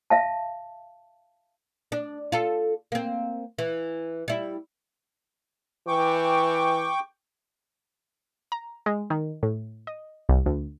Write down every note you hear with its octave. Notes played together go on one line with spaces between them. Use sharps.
E5 F5 A5
D4
F4 A4
A#3 C4
E3
G3 E4
E3 G5 C#6 D6
A#5
G#3
D#3
A2
D#5
C2
D2